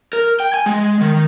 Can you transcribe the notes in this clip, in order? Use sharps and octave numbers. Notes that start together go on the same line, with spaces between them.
A#4
G5
G#5
G#3
D#3